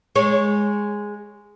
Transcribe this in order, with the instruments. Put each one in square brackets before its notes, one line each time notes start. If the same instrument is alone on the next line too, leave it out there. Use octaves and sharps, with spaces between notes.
[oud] G#3 C#5